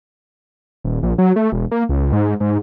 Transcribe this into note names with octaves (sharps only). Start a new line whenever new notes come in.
D#1
A#1
F#3
A3
E1
A#3
C#2
G#2
G#2